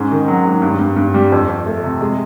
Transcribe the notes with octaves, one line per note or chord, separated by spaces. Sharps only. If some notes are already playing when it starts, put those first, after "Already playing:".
Already playing: G#2 C#4
D#3
F#3
G#2
G2
G2
G2
G3
F2
F2
A3
C3
G#3